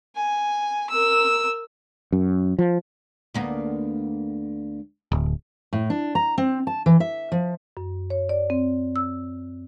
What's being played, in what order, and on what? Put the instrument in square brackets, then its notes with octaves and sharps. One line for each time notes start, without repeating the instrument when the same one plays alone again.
[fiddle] G#5
A#4 E6
[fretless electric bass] F#2
F3
[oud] D2 A#3 B3
[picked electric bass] D1
[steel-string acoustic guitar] A2
D4
A#5
C4
A5
E3
E5
F3
[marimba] F#2
C#5
D5
C4
E6